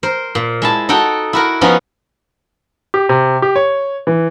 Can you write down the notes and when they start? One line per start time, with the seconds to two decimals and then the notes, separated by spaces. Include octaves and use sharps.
0.03 A#4 C5
0.35 A#2
0.62 G#3 E4 A5
0.89 D#4 F#4 A4 G5
1.33 E4 F#4 A#4
1.61 F3 B3 C#4 D#4 F#4
2.94 G4
3.09 C3
3.42 G4
3.56 C#5
4.07 E3